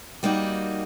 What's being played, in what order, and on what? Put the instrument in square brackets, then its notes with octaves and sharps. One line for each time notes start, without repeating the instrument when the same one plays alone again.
[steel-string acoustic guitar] G3 A#3 D#4 F#4